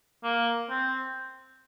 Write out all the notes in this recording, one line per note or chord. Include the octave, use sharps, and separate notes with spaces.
A#3
C4